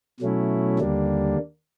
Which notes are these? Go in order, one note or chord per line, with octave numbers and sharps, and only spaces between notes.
B2 F#3 A3 C#4 E4
D#2 D3 G3 A#3 D4